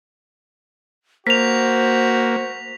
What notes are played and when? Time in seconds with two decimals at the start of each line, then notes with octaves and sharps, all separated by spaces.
1.27 A#3 F#4 C5 B6 F7